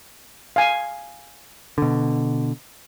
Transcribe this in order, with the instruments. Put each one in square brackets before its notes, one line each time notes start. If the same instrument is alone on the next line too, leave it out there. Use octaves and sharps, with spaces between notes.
[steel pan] F5 G#5
[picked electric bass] B2 D3